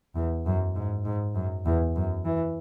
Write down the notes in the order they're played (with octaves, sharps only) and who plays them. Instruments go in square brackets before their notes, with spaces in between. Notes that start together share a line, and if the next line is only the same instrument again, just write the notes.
[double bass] E2
F#2
G#2
G#2
F#2
E2
F#2
E3